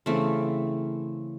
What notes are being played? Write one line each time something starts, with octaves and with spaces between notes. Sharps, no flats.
C#3 E3 A3 C4